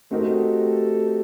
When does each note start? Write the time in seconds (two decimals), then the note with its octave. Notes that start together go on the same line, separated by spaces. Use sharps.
0.11 A3 C4 D#4 F#4 G4 A4 A#4